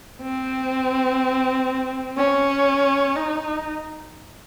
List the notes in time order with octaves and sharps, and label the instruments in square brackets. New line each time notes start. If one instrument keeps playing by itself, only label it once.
[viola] C4
C#4
D#4